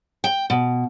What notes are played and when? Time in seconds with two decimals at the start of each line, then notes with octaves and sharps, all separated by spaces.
0.24 G5
0.50 B2